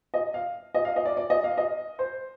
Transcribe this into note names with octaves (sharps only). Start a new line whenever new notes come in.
D#5
F5
D#5
F5
D#5
D5
D5
D#5
F5
D#5
C5